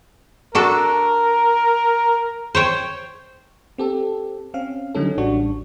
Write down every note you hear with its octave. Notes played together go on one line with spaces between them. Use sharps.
D4 F#4 A4 A#4
C5 C#5 G5
C4 G4 A4
C4 C#4 F5
D3 F#3 G3 C#4 D#4 A4
A1 G3 D4 F#4 C#6